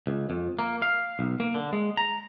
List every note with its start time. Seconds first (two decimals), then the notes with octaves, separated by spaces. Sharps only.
0.07 C#2
0.30 F2
0.59 A#3
0.82 F5
1.19 B1
1.40 A#3
1.54 D3
1.73 G#3
1.97 A#5